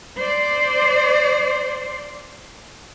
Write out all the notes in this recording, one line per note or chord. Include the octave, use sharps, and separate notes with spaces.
C5 D5